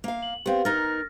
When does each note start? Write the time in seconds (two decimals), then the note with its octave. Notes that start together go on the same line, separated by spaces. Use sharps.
0.04 A#3 F5
0.22 F#7
0.46 B3 C4 G4 F5
0.65 D#4 A#4 F6 A6 A#6